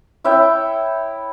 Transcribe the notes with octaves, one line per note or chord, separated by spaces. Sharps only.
E4 C#5 E5 G5